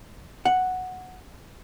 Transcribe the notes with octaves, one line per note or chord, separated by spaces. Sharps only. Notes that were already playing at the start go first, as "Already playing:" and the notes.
F#5